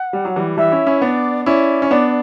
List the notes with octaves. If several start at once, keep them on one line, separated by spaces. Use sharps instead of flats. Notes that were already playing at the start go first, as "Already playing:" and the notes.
Already playing: F#5
G3
F#3
E3 G3
E3 G3 E5
C#4 E4
C#4 E4
B3 D4 D5
C#4 E4 D5
C#4
B3 D4 D5